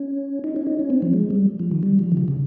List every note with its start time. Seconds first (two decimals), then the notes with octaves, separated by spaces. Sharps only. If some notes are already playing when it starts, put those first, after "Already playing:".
Already playing: C#4
0.44 D#4
0.56 C#4
0.67 D#4
0.79 C#4
0.90 C4
1.02 F3
1.13 G#3
1.30 G3
1.60 F3
1.71 D#3
1.83 G3
1.99 F3
2.12 D#3
2.17 C#3
2.28 C#3